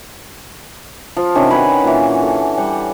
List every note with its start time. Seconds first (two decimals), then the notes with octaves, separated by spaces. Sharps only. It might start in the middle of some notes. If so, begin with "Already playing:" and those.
1.17 F3
1.35 C3 D#3 C#4 D4
1.50 F#4 B4 G#5 B5
1.84 A#2 E3
2.23 A4
2.58 G3 F#5